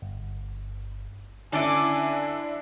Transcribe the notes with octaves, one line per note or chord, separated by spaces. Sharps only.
G1
D3 C#4 D4 E4 A4 D5 G#5 D6